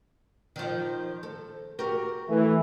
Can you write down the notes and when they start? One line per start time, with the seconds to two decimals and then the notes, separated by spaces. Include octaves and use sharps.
0.56 D#3 F3
1.23 A4
1.79 F#4 G4 A#4
2.29 E3 A3